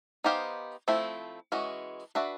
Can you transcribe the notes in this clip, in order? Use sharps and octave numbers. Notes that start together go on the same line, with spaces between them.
B3 D#4 G4 C5 F5
F3 A3 C4 E4
E3 G#3 C#4 F#4
D4 F#4 B4 E5